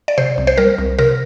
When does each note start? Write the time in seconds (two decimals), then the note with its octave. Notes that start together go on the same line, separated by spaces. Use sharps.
0.08 D5
0.18 C3 C5
0.38 C2
0.47 C5
0.58 G3 A#4
0.78 C2
0.99 C3 A#4